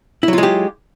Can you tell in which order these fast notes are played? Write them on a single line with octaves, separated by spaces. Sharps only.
E4 F#3 F4 G#3 G4